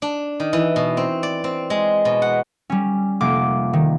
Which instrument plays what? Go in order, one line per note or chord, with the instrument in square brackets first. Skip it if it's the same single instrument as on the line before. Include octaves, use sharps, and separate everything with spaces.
[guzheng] D4
D#3
E3
B2
C4
D5
C4
G#3
B2
F#5
[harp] G3 C#4
F1 A#3 D6
D#3